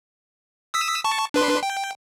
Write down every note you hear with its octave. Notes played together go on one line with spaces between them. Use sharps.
D#6 E6 B6
A5 C#6
D4 B4 C6
G5